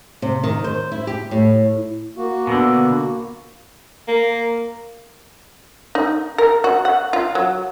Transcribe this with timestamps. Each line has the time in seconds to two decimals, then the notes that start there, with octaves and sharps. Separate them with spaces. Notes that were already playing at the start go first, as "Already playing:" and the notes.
0.22 C3
0.44 D#3
0.64 C5
0.92 E4
1.07 G4
1.31 A2
2.17 A#3 F#4
2.47 B2 D3
4.08 A#3
5.95 D#4
6.38 A#4
6.64 F#4
6.85 F#5
7.13 F4
7.35 F#3